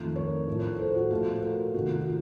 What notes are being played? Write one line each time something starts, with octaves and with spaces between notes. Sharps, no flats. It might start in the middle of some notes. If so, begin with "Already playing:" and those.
Already playing: F2 D#3 A3
A#4 C#5
A2 F3 A3
A4 C5
F#4
A#2 F3 A3 F4 A4
F#4 A#4
C3 D#3 A3 F#4
F#4
F4